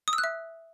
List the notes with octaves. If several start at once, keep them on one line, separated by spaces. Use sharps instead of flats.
D#6
E6
F#6
E5